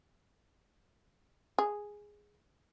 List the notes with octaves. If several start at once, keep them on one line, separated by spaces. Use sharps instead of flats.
G#4